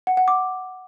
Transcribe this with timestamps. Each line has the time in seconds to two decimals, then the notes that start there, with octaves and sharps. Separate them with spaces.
0.07 F#5
0.17 F#5
0.28 D6